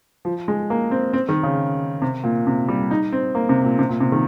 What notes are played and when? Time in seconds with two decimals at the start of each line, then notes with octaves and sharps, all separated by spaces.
0.25 F3
0.48 G#3
0.70 A#3
0.91 C4
1.13 C4
1.29 D#3
1.43 C#3
2.02 C3
2.24 A#2
2.47 C3
2.68 G3
2.91 D#4
3.13 C4
3.35 A#3
3.49 C3
3.64 A#2
3.79 C3
3.89 A#2
4.00 C3
4.12 D#3